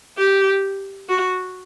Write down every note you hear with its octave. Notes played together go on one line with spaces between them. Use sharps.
G4
F#4